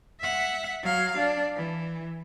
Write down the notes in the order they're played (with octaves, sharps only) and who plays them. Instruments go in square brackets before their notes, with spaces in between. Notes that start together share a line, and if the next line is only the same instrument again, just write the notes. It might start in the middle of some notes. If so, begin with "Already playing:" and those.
[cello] E5 F#5
F#3 F5
D4
E3